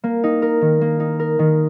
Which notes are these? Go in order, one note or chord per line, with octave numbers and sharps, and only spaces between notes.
A#3
D#4
A#4
D#3
A#3
D#4
A#4
D#3